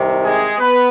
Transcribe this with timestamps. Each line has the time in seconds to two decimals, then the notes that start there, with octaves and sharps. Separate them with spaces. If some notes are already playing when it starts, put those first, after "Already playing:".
Already playing: C2 C3 D#3
0.22 G#3 G#4
0.59 B3 B4